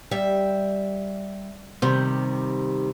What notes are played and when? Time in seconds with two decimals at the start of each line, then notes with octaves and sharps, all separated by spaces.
0.11 G3 E5
1.82 C3 D#3 G3 C5